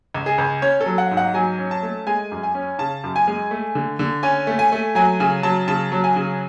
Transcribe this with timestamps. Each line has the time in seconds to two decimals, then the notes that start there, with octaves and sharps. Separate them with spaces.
0.14 C#2
0.26 G#4
0.38 C#2
0.62 C#4 C#5
0.81 A4
0.86 F#3
0.98 F#5
1.11 G#2
1.17 F#5
1.34 F#3 G#5
1.59 C#4
1.71 A5
1.83 A3
2.07 G#3 G#5
2.32 F#2
2.43 G#5
2.55 C#4
2.78 C#3 A5
3.04 F#2
3.16 G#5
3.28 G#3
3.51 A3
3.75 D3
3.99 D3
4.23 C#4 G#5
4.47 A3
4.59 G#5
4.72 A3
4.95 F#3 G#5
5.20 C#3 G#5
5.43 F#3 A5
5.68 C#3 A5
5.92 F#3
6.04 G#5
6.16 C#3